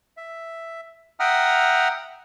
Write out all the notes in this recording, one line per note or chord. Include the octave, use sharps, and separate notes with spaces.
E5
E5 F#5 G5 A#5 D#6 F6